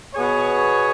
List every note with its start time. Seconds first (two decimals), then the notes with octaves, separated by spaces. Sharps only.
0.15 B2 B3 G#4 C#5